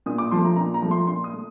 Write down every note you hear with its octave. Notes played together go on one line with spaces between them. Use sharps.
A#2 D#6
D6
F3 A3 C6
A#5
A#2 A#5
A#5
F3 A3
C6
A#2 C6
D#6
A3